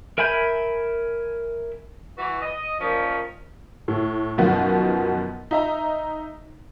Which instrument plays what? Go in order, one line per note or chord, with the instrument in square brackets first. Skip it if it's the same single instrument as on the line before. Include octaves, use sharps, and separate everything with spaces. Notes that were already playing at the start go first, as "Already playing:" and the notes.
[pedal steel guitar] A#4 E5 G#5 B5 G6
[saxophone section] E3 F#4
D#5
A#2 D#3 F3 C#4
[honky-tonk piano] A2
F#2 B2 D#3 F3 B3 F#4
D#4 E5 A#5